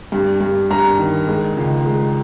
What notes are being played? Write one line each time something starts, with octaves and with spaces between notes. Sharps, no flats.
G2
G2
G2 A#5
D#3
G#3
C#2
G#3